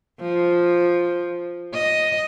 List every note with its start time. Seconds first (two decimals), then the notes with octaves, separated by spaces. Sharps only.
0.21 F3
1.74 D#5